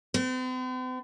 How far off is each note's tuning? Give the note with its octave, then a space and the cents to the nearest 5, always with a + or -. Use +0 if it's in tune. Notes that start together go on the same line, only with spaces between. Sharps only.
C4 -45